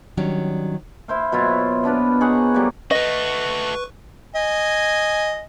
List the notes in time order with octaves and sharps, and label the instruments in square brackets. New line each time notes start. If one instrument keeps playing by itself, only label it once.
[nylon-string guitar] D#3 F#3 G3 C#4 D4
[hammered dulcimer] E4 C5 F5
B2 F#3 E4 F4
B3 D4 F4 B4
D#4 G#4 C#5 F#5
F#3 G3 A#3
[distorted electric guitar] A3 F#4 [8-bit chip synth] B4 C#6 [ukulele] D#5
[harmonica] D#5 G#5